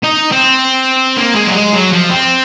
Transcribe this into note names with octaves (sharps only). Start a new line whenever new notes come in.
D#4
C4
A#3
G#3
F#3
G#3
F#3
F3
C4